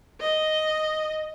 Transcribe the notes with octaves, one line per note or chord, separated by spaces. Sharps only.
D#5